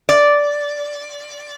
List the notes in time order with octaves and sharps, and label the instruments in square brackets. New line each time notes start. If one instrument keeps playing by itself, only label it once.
[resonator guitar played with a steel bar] D5